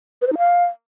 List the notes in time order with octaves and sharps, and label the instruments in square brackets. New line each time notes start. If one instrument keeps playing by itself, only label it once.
[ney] B4
C5
D#4
F5